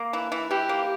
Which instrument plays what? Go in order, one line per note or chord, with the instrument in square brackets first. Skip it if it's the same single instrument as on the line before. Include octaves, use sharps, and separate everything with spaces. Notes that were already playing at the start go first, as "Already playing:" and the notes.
Already playing: [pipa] A#3
E3
E3
[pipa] E3 [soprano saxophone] G4
[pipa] A#3